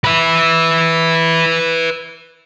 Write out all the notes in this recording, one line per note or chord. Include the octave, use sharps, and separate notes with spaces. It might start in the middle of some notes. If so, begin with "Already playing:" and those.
B4 E5